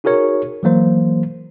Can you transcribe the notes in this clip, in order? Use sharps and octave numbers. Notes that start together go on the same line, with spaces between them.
D#4 F#4 G#4 A#4 C#5
E3 F#3 A#3 C5